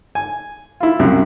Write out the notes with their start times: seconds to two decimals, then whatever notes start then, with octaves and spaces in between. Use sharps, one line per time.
0.15 G#5
0.80 E4 F4
0.99 C2 F#2